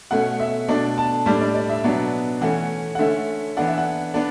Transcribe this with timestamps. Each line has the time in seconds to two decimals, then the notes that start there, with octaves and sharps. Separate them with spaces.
0.11 B2 A3 C#4 F#5
0.40 E5
0.69 B2 A3 D4 D5
0.98 A5
1.26 A2 G3 D4
1.41 D5
1.55 D5
1.69 E5
1.84 B2 F#3 B3 D4
2.41 E3 A3 C#4 F#5
2.95 F#5
2.99 D3 A3 C#4 E5
3.57 E3 B3 D4 F#5
3.68 E5
3.78 F#5
4.14 B3 D4